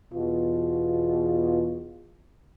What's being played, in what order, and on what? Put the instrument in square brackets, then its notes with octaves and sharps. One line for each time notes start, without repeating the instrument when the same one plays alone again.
[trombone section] E2 B2 F4